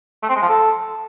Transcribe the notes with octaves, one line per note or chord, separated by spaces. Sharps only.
A3
C4
G#3
F3
A4